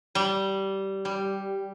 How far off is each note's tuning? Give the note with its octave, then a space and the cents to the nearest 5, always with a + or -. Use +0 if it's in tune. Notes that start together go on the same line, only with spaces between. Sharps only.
G3 -15
G3 +0